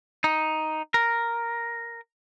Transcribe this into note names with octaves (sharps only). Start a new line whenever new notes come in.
D#4
A#4